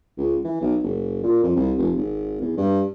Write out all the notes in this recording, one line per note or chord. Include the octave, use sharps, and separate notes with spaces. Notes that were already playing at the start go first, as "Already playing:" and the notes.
C#2
E3
B1
F#1
A#2
F2
C2
F1
G#1
E2
G2